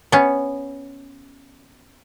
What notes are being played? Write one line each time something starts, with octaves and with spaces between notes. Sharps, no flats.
B3 C#4